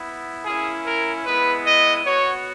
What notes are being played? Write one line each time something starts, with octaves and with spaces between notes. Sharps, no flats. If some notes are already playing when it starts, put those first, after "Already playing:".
Already playing: B3 E4
A#3 C#4 E4 G#4
A#4
G#3 B3 E4 B4
D#5
B3 F#4 C#5